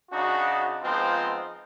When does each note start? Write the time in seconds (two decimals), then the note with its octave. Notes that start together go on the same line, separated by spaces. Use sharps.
0.11 C#3 D4 D#4 F#4
0.83 F3 G#3 B3 C4 D#4 F4